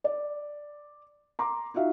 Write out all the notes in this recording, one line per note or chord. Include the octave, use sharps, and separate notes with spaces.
D5
A#5 C6 D6
D#4 F4 F#4 E5 F5